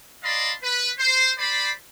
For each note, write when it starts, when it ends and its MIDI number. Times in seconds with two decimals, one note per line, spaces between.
0.24 0.51 74
0.24 0.51 75
0.24 0.51 77
0.24 0.51 81
0.24 0.51 83
0.24 0.51 84
0.63 0.91 71
0.99 1.31 72
1.38 1.71 72
1.38 1.71 74
1.38 1.71 83